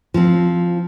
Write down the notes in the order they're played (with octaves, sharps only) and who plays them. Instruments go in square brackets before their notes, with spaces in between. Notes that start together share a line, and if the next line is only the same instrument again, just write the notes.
[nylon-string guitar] F3 C4